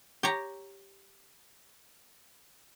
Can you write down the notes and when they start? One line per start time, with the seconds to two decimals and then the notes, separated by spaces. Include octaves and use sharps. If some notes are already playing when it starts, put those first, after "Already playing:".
0.23 G4 C#5 A#5